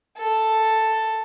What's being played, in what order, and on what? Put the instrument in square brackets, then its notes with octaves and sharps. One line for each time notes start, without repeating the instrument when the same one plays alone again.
[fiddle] A4